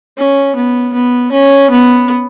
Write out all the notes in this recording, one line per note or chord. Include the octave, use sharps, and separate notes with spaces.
C#4
B3
B3
C#4
B3